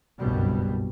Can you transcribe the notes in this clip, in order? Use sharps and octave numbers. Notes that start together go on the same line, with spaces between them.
F#1 C2 G2 B2 G3